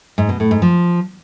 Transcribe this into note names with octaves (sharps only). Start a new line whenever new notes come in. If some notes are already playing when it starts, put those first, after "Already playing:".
G#2
B2
A2
G#2
F3